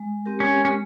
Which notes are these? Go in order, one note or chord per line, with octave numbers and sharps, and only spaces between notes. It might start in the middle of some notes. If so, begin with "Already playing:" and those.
Already playing: G#3
C4 G4 A#4
C#4
C#4
G#3